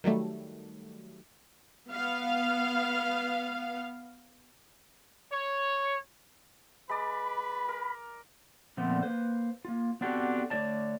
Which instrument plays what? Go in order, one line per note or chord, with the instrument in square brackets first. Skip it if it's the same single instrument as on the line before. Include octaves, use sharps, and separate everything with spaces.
[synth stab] D#3 F#3 G3 A3
[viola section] B3 F5
[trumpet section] C#5
[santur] G#3 D5 [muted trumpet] B4 [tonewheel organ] B5
[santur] A#4
[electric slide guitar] A#2 D3 F3 A3 B3 C4
A#3 B4 C5
A#3 F4
B3 C4 D4 F#4 G4 A4
D3 A3 G#4 C#5 D5 A5